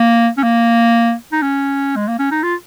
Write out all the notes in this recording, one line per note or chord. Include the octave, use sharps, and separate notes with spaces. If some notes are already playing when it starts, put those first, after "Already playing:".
Already playing: A#3
C#4
A#3
D#4
C#4
G#3
A#3
C#4
D#4
F4